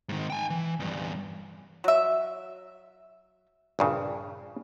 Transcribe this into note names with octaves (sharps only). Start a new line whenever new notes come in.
G#2 D#3
G5 G#5
E3
E2 G2
F#3 E5
A#1 G2 C#3